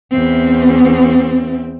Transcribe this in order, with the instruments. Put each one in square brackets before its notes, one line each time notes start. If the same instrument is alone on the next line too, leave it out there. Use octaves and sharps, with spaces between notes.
[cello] E2 C4